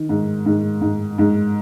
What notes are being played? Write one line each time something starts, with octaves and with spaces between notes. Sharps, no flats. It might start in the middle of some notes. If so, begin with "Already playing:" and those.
Already playing: D#3
G#2
G#2
G#2
G#2